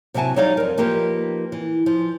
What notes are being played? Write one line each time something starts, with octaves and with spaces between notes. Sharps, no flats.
C3 F#3 E4 F#4 G#5 A5
F#3 G3 D#4 C#5 D5 F5
F2 A#4
F3 A#3 D#4 G4 B4
E3
F3